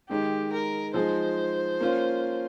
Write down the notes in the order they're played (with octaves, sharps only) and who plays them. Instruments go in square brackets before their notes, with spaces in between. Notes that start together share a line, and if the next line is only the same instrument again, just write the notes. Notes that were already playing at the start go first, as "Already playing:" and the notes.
[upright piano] D#3 G#3 D#4 [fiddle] G4
[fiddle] A#4
[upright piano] F3 G#3 D#4 G#4 [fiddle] C5
[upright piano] A#3 C#4 F4